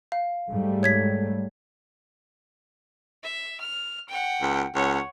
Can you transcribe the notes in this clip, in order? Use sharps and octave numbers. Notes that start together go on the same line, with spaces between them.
F5
G#2 G3 A3
C#5 G#6 B6
E5
F6
F#5 G5
C#2
C#2 C#5 F#5